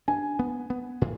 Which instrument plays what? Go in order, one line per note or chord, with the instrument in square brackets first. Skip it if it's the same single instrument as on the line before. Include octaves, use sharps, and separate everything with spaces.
[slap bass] D4 [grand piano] G#5
[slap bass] B3
B3
A2